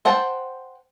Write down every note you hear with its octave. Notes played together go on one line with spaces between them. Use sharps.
C5 F#5 G5 A5